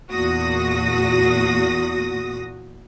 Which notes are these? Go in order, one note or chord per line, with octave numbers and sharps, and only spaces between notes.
E2 A#2 F#4 D#6 A#6